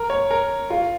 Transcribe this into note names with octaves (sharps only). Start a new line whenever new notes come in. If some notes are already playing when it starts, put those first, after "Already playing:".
Already playing: A#4
C#5
A#4
F4